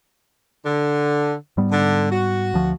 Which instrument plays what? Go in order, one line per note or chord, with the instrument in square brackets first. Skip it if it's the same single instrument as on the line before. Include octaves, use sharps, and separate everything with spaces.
[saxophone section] D3
[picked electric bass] G#2 G3 B3
[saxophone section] D3
F#4
[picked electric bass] D2 F3